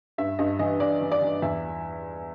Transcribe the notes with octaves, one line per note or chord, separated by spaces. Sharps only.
G2 E5
G2 D#5
E3 D#5
E3 D5
E3
D5
E3
E2 E5